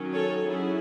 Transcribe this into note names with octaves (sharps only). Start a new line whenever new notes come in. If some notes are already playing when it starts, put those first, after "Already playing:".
Already playing: D#3 F#3 C#4
A4 C#5
F#3 C#4 E4 G#4